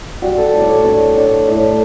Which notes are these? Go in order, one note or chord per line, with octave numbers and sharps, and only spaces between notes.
G3 F#4
A4
A2
D5
C#5
D4 C#5
D4
A2